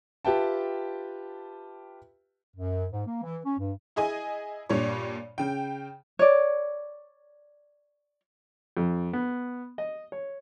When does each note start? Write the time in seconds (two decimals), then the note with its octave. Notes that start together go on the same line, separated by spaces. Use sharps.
0.25 F4 G4 B4 E5 G5 A5
2.55 F#2
2.92 G#2
3.07 A#3
3.23 E3
3.45 C#4
3.59 G2
3.96 E4 G#4 D#5 G#5
4.69 G2 A#2 G3 C#5
5.38 C#3 G5
6.19 C#5 D5
8.77 F2
9.13 B3
9.78 D#5
10.12 C#5